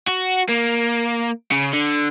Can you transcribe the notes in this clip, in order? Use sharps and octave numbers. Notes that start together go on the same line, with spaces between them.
F#4
A#3
C#3
D3